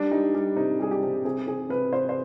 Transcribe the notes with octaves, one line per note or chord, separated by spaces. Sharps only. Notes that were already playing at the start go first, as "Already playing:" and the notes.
Already playing: G3 D4
G3 D#4
G3
C3 D#4
G3 G#4
G4
C3
C3 G#4
C3 G#4
C3 B4
C3 C5
C5